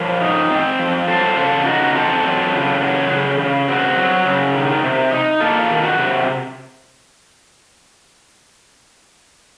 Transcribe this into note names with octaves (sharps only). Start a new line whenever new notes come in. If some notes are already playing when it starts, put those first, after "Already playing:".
Already playing: F3 A#4 C#5
D#4
C4
F3
F#3 A4 C5
C#3 F4 A4
D#4 F#4
C4 F4 A4
F#3
C#3
F#3
C#3
C#3
C4 F#4
F#3
C#3
D#3
C3
D#4
A#3 F4 A4
D#3
F#4
C3